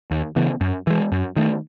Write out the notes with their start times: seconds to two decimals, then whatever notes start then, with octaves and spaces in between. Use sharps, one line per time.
0.11 D#2
0.36 C#3 E3 B3
0.61 F#2
0.87 E3 G#3
1.12 F#2
1.36 D#3 A3